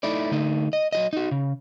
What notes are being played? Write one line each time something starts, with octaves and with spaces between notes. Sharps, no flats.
A3 D#4 E4 D5
D3 A3 D#4
D#5
F#3 F#4 D#5
D#4 F#4
C#3